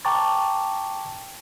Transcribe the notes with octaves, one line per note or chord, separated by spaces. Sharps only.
G5 A5 A#5 C#6 D6 A6